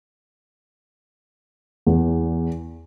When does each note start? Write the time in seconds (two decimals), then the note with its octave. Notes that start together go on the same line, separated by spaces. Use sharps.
1.86 E2